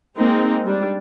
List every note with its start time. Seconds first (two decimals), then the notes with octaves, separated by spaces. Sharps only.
0.19 G#3 A#3 C4 D#4
0.65 G3 D4